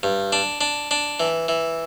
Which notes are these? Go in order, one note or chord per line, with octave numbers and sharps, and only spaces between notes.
G2
D4
D4
D4
E3
E3